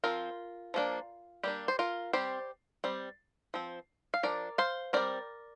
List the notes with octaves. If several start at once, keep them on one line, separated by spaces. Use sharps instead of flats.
F3 C4 F4 A#4
F3 A#3 D4
G3 A#3 D4 G4
C5
F4 A#4
G3 C4 G4 C5
G3 C4
F3 C4
F5
F3 D4 A#4 D5
C5 F5
G3 C4 A#4 D5